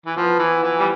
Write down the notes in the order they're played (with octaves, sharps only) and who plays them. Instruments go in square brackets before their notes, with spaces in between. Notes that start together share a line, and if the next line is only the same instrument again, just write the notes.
[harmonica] E3
[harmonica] F3 [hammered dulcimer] B3
[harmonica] E3
[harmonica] E3 [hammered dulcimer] F3
[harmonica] G3